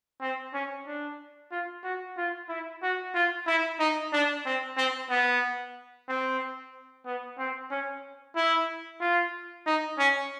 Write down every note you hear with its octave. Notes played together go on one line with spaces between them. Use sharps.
C4
C#4
D4
F4
F#4
F4
E4
F#4
F4
E4
D#4
D4
C4
C4
B3
C4
B3
C4
C#4
E4
F4
D#4
C#4